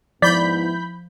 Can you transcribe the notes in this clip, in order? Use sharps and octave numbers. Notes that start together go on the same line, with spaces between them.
G#2 F3 B3 E4 D5 B5 G6 B6